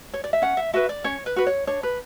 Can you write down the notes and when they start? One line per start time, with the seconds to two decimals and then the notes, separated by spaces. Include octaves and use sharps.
0.14 C#5
0.24 D5
0.33 E5
0.42 C#4 F#5
0.57 E5
0.73 F#4 B4 E5
0.89 D5
1.04 C#4 C#5
1.26 B4
1.36 F#4 B4
1.47 C#5
1.67 D4 C#5
1.83 B4